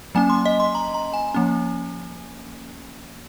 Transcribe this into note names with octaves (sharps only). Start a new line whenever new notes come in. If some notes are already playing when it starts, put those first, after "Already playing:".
F#3 A#3 C#4 G#5
C6
D#5
C6
A#5
A#5
G#5
F3 A#3 C#4